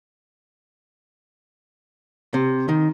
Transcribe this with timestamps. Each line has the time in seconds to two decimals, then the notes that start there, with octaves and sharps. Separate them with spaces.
2.34 C3
2.69 D#3